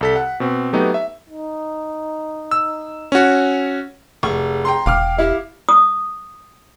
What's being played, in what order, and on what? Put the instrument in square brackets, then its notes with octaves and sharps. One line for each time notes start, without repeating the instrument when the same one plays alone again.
[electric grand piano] C2 A4 B6
F#5
B2 C4
F#3 A3 B3 D#4 G4
E5
[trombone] D#4
[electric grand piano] E6
C#4 F#4
[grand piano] F1 [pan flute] G#4 [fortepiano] C#6
[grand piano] G5 A#5 C6
[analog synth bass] E1 [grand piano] F5 D6 F6 [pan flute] G5
[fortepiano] E4 [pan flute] G4
[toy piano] D#6